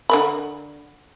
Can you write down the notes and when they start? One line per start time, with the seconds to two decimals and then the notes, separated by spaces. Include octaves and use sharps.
0.10 D3 A#4 B5